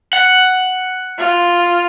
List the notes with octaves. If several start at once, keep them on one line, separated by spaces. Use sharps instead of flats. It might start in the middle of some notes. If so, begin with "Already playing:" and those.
F#5
F4